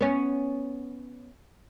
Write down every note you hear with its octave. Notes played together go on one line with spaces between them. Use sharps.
B3 C#4